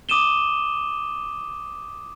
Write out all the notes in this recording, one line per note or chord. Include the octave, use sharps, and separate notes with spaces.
D6 D#6 D#7 E7 G7